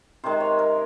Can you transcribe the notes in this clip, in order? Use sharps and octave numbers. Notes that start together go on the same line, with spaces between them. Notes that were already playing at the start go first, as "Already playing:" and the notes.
C3 D#3 G#3 C5
C#5
A#4